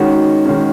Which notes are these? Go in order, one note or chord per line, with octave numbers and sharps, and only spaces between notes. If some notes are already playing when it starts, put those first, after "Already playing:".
Already playing: D#3 G#3 C#4 F#4
D#3 G#3 C#4